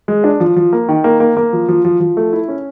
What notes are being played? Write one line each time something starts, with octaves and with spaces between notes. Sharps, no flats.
G#3
D4
F3
F3
A#3
D#3
A#3
A#3
A#3
F3
F3
F3
F3
A3
E4
C#4